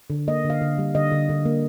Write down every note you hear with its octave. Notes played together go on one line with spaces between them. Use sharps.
D3
A#3 D#5
D3
F5
D3
G3
D3 D#5
D3
D3
A#3